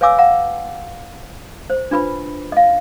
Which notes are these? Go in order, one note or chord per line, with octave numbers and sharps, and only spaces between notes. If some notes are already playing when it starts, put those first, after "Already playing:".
B4 C#5 F5 G#5 D6 E6
F5 F#5 A#5
C5
D4 F4 B4 B5
D#5 F5